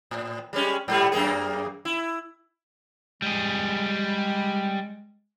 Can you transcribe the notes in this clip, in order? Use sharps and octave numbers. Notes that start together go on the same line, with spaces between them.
A2
G3 G#3 C#4
G#2 G3 A3
F#2 A#3 G#4
E4
G3 G#3 G#4